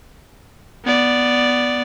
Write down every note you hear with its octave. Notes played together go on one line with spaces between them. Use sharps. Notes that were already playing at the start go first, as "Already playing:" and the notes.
B3 D5